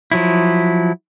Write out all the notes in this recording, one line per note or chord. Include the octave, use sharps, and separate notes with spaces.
F3 F#3 E4